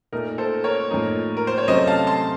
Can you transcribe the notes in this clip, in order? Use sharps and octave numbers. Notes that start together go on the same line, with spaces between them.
A#2 A3 D#4 A#4
A4 C5
A#4 C#5
A2 F3 A#3 D#4
A#4
C5
C#5
C3 F#3 A3 C#4 C5 D#5
F5 A5
A5 C6